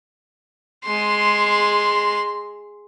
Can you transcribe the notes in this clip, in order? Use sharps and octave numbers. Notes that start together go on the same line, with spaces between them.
G#3 C6